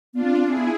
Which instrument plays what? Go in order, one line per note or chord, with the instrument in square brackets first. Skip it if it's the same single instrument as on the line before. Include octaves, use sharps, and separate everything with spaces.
[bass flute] B3 [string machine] D4 F4
[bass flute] C4
C4
[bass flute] C4 [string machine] E4 G#4
[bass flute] B3